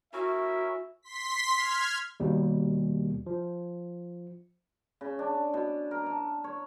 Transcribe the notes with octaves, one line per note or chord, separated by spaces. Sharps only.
C#4 E4 F#4 A#4 E5
C6 B6
F6 G#6
D#2 B2 G3
F3
C#3
D4
B2
A#4
A5
C#5